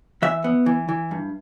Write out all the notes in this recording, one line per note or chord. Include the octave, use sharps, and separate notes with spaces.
E3 E5
B3
E3
E3
G2